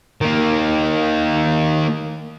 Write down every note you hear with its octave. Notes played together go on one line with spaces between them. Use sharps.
D#3 A#3